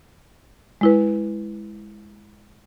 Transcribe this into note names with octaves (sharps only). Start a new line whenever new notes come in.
G#3 E4 B4